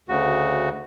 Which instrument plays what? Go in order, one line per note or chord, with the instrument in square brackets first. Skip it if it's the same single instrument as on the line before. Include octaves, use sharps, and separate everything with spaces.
[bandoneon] D2 C#3 F#4